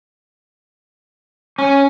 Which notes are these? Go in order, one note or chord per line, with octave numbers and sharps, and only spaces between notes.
C#4